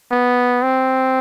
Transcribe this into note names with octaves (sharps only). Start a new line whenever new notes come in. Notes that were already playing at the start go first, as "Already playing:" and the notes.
B3
C4